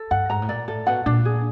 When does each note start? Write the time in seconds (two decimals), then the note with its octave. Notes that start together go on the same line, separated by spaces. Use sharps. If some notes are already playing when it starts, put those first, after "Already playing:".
Already playing: A4
0.11 G2 F#5
0.29 G#2 A#5
0.42 A2
0.49 A#2 D5
0.68 A2 A4
0.87 B2 F#5
1.06 A#2 D4
1.25 G#4